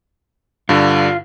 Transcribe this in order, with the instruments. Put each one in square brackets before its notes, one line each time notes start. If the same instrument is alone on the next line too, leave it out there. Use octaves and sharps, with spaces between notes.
[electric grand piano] G2 D3 [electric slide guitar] F4